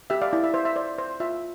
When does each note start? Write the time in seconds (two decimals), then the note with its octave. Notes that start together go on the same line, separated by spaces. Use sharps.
0.10 G4 E5
0.21 D5 F5
0.33 E4 D5
0.44 E5
0.54 C5 E5
0.65 E5
0.76 C5 D5
0.98 C5
1.20 F4 E5